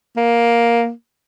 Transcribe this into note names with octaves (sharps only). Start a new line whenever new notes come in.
A#3